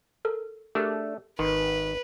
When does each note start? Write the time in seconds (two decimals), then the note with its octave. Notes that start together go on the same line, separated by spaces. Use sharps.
0.25 A4 A#4
0.75 A3 D4 G4 G#4 A#4
1.39 G#1 D#3 B4 C6